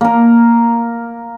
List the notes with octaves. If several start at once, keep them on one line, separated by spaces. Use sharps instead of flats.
A#3 A#4